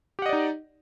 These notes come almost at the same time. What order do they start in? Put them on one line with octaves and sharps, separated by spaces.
G4 F#5 D#5 D5 D#4